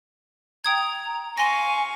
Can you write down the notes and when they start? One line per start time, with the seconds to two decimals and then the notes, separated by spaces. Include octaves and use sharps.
0.64 G5 A#5 D#6 G#6
1.38 F5 G#5 C6 C#6 A#6